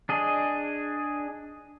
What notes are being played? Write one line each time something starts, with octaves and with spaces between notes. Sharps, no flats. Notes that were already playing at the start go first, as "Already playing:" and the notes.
D4 G#4 D#5